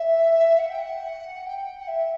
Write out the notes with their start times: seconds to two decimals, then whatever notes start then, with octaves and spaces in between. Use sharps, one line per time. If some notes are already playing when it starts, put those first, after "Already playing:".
Already playing: E5
0.58 F#5
0.69 G5
0.79 F#5
1.45 G5
1.80 F#5
1.87 E5